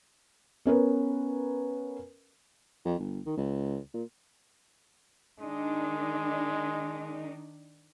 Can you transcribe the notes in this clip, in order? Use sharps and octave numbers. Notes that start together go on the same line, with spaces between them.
B3 C#4 A#4 B4
F2
G1
D#3
C#2
A#2
D#3 G#3 D4 D#4